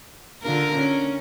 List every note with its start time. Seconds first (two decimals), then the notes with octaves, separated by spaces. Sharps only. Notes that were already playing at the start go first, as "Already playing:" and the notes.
0.43 D3 F4 A#4
0.75 C#4